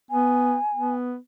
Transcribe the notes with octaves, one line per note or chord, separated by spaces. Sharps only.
B3 G#5
B3